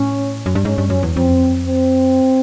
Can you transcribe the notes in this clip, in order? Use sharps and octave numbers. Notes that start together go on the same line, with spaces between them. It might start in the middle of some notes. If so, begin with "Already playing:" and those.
Already playing: A2 C#4
F#2
G2
G#2 C#4
G2
F#2
E2
F2 C4
C4